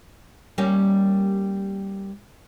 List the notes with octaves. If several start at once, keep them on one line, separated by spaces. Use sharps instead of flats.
G3 A#3 C#4